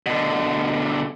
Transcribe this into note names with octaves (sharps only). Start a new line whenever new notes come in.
B2 D3